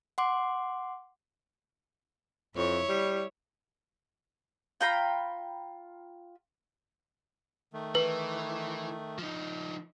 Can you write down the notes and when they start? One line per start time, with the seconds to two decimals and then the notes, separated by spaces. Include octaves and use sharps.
0.18 F#5 C6 D6
2.56 F2 E4 C#5
2.89 G3
4.81 F4 G5 A#5 B5
7.74 D#3 A3
7.95 E3 B4
9.18 F3 D#4